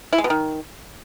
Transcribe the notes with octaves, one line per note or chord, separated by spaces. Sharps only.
E4
G#3
B2
D#3